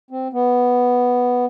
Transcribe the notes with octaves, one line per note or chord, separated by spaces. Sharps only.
C4
B3